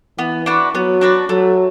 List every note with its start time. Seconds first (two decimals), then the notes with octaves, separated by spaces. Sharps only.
0.18 E3 B3
0.46 D4 F#4 B4
0.75 F#3 B3
1.01 D4 F#4 B4
1.29 F#3 A3